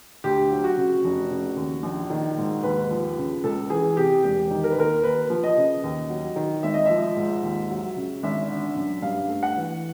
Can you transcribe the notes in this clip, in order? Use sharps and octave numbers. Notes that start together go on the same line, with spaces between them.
D2 G4
F#3
F#4
C#3
F1
C#3
D#2
A#1
D#3
G#2
D#2 B4
F3
C#3
C#2 A4
E3 G#4
C3 G4
E1 G4
D#3
A#4
B4
D#2 A#4
D#2 B4
F3
D#5
C#3
D#2
F#3
D#3
G#1 E5
D#5
F3 E5
G#2
D#2
F#3
C#3
G#1 E5
D3
F#2
G2 F5
A3
F#5
E3